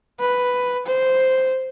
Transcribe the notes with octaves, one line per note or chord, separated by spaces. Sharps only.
B4
C5